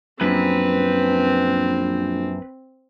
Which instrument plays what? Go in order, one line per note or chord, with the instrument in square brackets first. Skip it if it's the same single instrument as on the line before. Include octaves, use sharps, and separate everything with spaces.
[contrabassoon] A#1 [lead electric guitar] F#2 [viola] C4 [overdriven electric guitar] B4